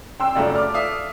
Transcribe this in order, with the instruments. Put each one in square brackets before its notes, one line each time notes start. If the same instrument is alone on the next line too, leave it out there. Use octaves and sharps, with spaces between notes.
[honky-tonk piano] G5 C6 E6
[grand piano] F#2 C#3 [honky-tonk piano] A3 F4 D5
[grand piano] D6 F6
E5 F5 D#6